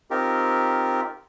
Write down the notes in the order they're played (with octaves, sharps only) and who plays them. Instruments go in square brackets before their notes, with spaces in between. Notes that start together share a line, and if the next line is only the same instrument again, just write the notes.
[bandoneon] C4 D#4 F4 G4 A#4